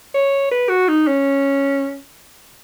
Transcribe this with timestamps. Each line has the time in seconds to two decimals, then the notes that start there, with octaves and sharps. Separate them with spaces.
0.15 C#5
0.51 B4
0.69 F#4
0.89 D#4
1.07 C#4